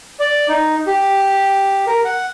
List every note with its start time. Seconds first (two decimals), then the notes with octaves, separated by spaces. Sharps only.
0.20 D5
0.49 D#4
0.87 G4
1.87 A#4
2.05 F#5